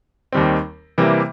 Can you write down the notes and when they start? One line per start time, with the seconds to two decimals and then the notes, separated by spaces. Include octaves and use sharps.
0.32 D#2 D#3 G3 C4
0.98 C3 E3 G3 A#3